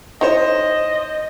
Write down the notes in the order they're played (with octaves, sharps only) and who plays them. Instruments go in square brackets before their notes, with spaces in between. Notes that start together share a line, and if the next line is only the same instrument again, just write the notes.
[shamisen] D#4 E4 C#5 [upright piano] C5 C6 [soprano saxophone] D#5